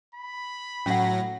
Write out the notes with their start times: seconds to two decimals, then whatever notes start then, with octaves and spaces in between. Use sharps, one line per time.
0.15 B5
0.86 A2 F#3 C#4 F#5 A#6